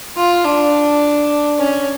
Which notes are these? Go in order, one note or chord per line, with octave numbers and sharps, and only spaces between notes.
F4
D4
C#4